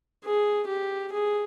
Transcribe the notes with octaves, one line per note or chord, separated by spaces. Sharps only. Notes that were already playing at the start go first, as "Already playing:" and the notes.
G#4
G4
G#4